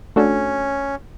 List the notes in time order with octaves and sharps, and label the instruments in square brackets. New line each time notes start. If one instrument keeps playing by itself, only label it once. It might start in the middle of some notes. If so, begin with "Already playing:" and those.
[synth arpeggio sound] A3 D4 F#4 A4 [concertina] C#4